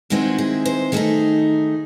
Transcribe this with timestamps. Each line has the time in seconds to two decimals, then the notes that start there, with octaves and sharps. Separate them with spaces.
0.10 D#3 G#3 C4 E4 F#4
0.38 G#4
0.65 C5
0.92 D#3 A3 D#4 G#4